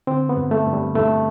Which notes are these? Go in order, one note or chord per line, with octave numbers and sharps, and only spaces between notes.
D3 C4
B3
G2
A3
G2
G3
G2 A3